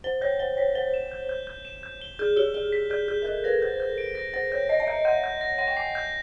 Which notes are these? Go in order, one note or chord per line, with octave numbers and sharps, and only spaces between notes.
C5 G7
C#5 G6
C5 G7
C#5 B6
C5 G7
E7
G6
G6
G6
E7
G6
G7
G#4 G6
G4 G7
G#4 G7
B6
G#4 G6
G#4 G6
A#4
A4 G6
B4 A#6
C5 G6
G6
D7
A#6
C5 A#6
C#5 G6
D#5 A#6
D#5
E5 G6
F#5 G6
G6
A#6
F#5 A#6
G5
G#5 C7
G6